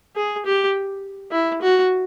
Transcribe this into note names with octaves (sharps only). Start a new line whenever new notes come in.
G#4
G4
E4
F#4